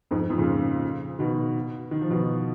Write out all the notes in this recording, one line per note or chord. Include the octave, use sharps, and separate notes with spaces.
F2 G#2
F2 G#2
A#2 C#3
B2 D#3
D#3
F3
B2 D#3